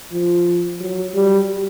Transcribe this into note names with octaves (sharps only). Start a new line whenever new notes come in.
F3
F#3
G3